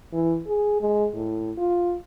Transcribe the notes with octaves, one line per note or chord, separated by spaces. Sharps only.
E3
G#4
G#3
A2
F4